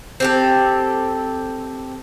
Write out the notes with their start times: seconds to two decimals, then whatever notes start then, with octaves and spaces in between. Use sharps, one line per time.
0.20 C4 G4 A4